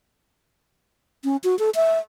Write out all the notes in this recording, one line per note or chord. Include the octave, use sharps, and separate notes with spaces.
C#4
F#4
A4
E5